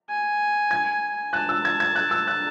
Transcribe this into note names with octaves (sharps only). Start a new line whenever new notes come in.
G#5
G#6
A5 F#6
E6
G#6
G#6
F#6
E6
F#6